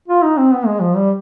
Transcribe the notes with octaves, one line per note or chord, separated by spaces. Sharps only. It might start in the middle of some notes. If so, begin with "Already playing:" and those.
F4
D#4
C4
B3
G#3
F3
G3